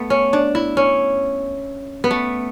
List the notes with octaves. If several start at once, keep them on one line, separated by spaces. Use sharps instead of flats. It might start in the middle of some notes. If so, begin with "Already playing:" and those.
Already playing: A3 B3
C#4
D4
E4
C#4
B3
A3